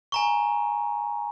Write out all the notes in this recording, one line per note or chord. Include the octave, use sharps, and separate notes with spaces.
G#5 A#5 C#6